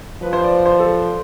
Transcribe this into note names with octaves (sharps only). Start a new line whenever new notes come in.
F3 B4
C5
D5
C5
A4